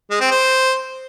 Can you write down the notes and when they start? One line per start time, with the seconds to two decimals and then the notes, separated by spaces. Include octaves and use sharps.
0.10 G#3
0.21 C4
0.31 C5